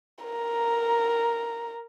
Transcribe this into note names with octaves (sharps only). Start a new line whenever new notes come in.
A#4 A#5